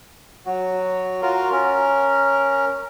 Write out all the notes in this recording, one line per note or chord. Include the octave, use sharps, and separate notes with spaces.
F#3 F#4
F4 F#4 A#4
C#4 A#4